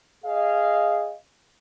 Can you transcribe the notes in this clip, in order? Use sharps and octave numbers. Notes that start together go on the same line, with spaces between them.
G#4 D#5 F5